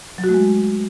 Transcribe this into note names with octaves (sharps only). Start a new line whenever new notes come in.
F#3
F#4
A3
G#3